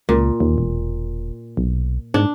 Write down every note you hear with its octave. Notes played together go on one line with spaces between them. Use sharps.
C#2 A#2
D#2
E1
B1
G#2 D4